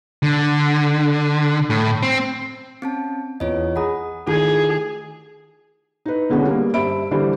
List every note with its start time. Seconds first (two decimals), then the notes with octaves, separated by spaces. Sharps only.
0.23 D3
1.70 A2
2.03 C4
2.82 C4 C#4 A5
3.40 E2 F4 C#5 D#5
3.76 G#4 F#5 A#5 B5 D#6
4.27 D#3 A3 E4 F4 G#4 G#6
6.06 D#4 B4
6.30 B2 D3 G#3 B3 C#4
6.46 G3 A#3
6.74 G2 C5 E5 B5 D7
7.11 D3 E3 G3 C5